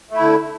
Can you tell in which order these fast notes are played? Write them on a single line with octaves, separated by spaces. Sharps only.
A3 E4 D3